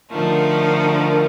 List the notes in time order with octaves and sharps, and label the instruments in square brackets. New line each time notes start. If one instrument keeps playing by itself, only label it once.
[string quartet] D3 F3 A3 D#4 [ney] A#4
[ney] A#4